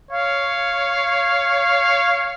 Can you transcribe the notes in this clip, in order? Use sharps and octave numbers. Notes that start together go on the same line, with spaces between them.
C#5 F5